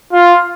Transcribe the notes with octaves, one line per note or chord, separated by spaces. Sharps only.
F4